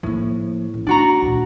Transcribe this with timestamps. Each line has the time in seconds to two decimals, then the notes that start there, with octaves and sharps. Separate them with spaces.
0.03 A2 F3 A#3
0.74 A1
0.87 A3 D4 F#4 A#5
1.22 D2 A#2